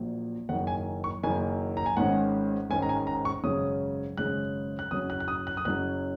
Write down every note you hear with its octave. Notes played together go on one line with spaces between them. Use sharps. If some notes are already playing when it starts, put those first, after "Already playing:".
Already playing: A#1 A#2 F#3
F#1 F#2 D#3 A#3 F#5
G#5
C#6
F#1 F#2 D#3 A#3 G#5
A#5
G#5
G#1 G#2 D#3 G#3 C#4 F#5
G#1 G#2 D#3 G#3 C#4 G#5
A#5
G#5
A#5
C#6
G#1 F#2 C#3 G#3 C#4 D#6
G#1 F#2 C#3 G#3 C#4 F#6
F#6
F#1 F#2 F#3 C#4 D#6
F#6
F#6
D#6
F#6
D#6
F#1 F#2 F#3 C#4 F#6